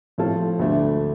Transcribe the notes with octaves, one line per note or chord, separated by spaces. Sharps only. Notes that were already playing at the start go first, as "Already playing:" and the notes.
A2 F3 C4 F4 A4
D2 D3 A3 D4